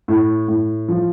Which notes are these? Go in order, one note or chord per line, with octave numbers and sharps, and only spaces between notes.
A2
A2
F3